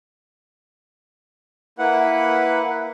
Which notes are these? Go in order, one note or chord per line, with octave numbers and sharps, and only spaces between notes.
A#3 E4 B4 F#5